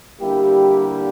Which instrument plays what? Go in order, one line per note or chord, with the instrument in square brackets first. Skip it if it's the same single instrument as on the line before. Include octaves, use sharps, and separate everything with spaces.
[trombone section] D3 G3 A#3 E4 G4